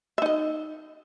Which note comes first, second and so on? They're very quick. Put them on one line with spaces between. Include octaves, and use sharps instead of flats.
E5 D#4 D#5